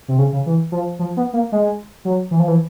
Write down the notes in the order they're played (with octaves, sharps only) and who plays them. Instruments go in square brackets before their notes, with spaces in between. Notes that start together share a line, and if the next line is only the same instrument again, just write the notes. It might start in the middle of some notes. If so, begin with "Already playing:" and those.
[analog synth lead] C3
C#3
C#3
E3
F3
F3
B3
A#3
G#3
F#3
E3
F3
E3